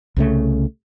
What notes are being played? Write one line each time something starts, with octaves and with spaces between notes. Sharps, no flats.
C2 C#3 A3